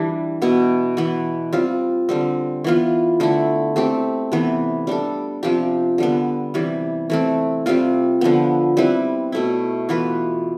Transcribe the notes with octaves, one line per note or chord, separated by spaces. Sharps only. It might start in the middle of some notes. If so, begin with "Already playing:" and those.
Already playing: E3 G3 D4
B2 B3 E4
E3 B3 E4
G3 C4 F4
D3 G3 C4
E3 B3 F4
D3 A3 E4
A3 C4 G4
C3 E3 B3
G3 D4 A4
C3 F3 C4 G4
D3 G3 B3
C3 E3 G3
E3 A3 C4
C3 G3 C4 F4
D3 F3 B3
G3 C4 E4 B4
B2 A3 E4
E3 B3 F4 B4